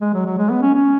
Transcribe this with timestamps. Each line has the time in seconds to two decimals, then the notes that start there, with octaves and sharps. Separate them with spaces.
0.01 G#3
0.14 F#3
0.26 F#3
0.38 G#3
0.50 B3
0.62 C#4
0.75 C#4